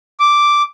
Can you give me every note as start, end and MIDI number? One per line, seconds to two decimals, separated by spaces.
0.20 0.62 86